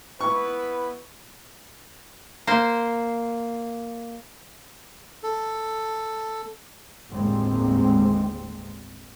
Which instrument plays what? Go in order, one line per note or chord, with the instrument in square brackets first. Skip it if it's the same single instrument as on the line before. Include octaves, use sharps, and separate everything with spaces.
[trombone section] B3 E4 B4 [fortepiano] C#6
[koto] A#3 C5
[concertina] A4
[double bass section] G1 D#2 A2 G3 G#3 C4